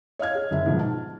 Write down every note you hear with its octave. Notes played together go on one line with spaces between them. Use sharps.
C#5 D#5 F5 F6 G#6
G#4
F#1 E5
G#2 B2 F3
A5